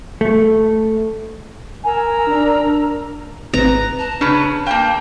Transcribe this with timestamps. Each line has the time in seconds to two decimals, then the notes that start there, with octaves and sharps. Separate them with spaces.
0.21 A3
1.84 A#4 G#5 A#5 E6
2.27 D4
3.54 G#1 C4 B4 A#5
3.98 A5
4.21 C#3 C#4 D4 B4
4.67 A#3 F5 G5 A5 G6